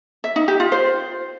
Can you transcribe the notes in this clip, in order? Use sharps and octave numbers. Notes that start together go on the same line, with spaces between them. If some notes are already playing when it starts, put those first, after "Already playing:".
E5
D#4
G4
F4
C5